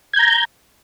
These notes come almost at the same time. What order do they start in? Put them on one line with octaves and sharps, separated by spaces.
G#6 G6 A#5